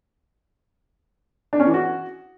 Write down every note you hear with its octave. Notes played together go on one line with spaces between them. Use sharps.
D4
C#4
E3
F#4